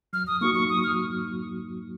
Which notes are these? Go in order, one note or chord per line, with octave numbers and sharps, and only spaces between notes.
F#3 F6
D#6
A#3 D#4 F#4 C#6
C#6
F#3 D#6
F6